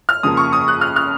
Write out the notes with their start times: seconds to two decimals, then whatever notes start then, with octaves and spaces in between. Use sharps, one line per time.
0.09 F6
0.23 F2 C#3 F3 A#3 D#6
0.37 C#6
0.53 D#6
0.68 F#6
0.81 F6
0.96 F6